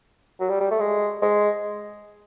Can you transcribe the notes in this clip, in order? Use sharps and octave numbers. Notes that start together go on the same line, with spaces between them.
F#3
G3
G3
A3
G#3
G#3